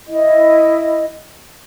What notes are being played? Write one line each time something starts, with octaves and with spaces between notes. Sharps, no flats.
E4 D#5